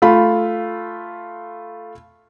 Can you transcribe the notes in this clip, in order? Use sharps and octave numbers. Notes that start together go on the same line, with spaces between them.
A3 F4 B5